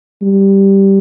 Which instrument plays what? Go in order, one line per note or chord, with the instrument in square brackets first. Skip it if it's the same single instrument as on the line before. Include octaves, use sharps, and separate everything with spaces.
[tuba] G3